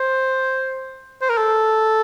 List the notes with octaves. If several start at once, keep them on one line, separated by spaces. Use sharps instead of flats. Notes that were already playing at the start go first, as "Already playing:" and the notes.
Already playing: C5
C5
A#4
A4